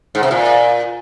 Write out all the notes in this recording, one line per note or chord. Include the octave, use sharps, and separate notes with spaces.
G#2
C3
A#2